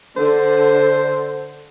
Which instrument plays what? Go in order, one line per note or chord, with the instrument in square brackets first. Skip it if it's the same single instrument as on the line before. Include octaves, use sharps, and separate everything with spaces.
[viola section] D3 [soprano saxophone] C5